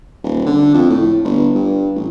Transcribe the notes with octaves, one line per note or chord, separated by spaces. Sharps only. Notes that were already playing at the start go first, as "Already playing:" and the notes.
D#1
D3
F2
A2
G1
G2
A1